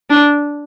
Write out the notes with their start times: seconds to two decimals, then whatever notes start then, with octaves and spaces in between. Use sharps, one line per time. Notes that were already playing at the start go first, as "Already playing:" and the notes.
0.10 D4